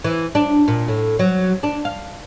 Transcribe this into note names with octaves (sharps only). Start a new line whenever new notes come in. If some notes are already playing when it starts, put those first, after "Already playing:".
E3
D4
A#2
A2
F#3
D4
F5